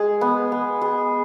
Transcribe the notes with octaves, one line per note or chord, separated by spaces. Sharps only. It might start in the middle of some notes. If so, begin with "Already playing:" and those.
Already playing: G#3 G#4
B3
B3
G#4